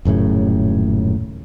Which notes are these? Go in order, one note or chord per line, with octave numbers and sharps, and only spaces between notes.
D#1 F#2 A2 C#3